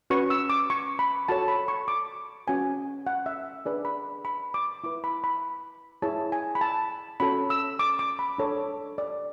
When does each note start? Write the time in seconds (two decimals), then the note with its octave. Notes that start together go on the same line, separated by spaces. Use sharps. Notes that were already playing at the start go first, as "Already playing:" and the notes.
0.10 C#4 F#4 B4 C#6
0.30 E6
0.50 D6
0.70 C#6
0.99 B5
1.29 F#4 A4 C#5 A5
1.48 B5
1.68 C#6
1.88 D6
2.47 C#4 F#4 B4 G#5
3.07 F#5
3.26 E5
3.65 D4 G#4 B4 D5
3.85 B5
4.25 B5
4.54 D6
4.84 E4 B4 D6
5.04 B5
5.24 B5
6.02 E4 G#4 C#5 A5
6.32 G#5
6.55 B5
6.61 A5
7.20 C#4 F#4 A4 C#5 B5
7.50 E6
7.79 D6
7.99 D6
8.19 B5
8.38 D4 A4 C#5
8.98 D5